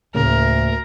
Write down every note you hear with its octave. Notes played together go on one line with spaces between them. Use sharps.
D2 A2 C#3 A#3 A#4